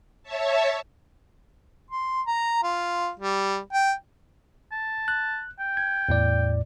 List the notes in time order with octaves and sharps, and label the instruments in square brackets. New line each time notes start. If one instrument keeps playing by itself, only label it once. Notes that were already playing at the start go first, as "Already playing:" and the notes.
[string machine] C#5 E5 A5
[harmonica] C6
A#5
F4
G3
G5
[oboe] A5
[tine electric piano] F#6
[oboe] G5
[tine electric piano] G#6
E2 A2 D5